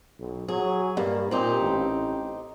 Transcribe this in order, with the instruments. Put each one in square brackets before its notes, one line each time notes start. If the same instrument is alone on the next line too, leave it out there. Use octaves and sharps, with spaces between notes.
[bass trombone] B1
[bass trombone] F#3 [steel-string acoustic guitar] G#4
[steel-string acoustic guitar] G2 [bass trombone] A#3
[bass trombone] A#2 [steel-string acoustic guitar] C4 D#4 G4
[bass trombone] A1